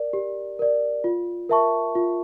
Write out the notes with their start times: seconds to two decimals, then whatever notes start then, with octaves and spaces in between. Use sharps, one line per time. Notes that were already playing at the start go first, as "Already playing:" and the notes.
Already playing: A#4 D5
0.13 G4
0.59 A#4 D5
1.04 F4
1.49 A#4 E5 A5 C#6
1.95 F4